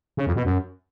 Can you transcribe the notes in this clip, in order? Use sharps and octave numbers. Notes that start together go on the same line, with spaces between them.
C#3
F2
B2
F#2